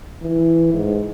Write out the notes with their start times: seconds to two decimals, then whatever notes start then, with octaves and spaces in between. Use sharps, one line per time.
0.23 E3
0.74 G#2